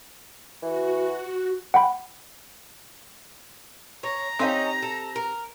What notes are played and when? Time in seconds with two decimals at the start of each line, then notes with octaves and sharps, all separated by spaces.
0.62 E3 F#4
1.74 F#5 G5 B5
4.03 C#5 A#5
4.39 C4 C#4 D#4 G4 F5
4.82 A4
5.16 A#4